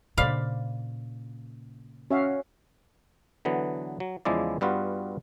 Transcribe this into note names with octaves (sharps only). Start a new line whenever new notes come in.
A#2 C#3 C5 D5 F5 B5
C#4 F#4 E5 F5
D3 E3 F#3 B3
F#3
E2 C#3 F3 G#3 E4 D5
G2 G3 B3 F4 F#4